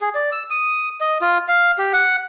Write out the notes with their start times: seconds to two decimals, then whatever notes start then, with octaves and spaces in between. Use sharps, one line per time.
0.01 G#4
0.15 D5
0.32 E6
0.50 D#6
1.01 D#5
1.21 F4
1.48 F5
1.78 G4
1.93 F#5